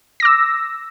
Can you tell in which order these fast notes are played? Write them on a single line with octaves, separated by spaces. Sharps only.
A#6 D6 E6